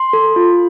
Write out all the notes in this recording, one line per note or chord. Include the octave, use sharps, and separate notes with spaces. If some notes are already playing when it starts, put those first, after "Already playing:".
Already playing: C6
A4
F4